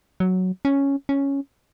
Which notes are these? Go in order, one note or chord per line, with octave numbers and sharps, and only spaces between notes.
F#3
C#4
C#4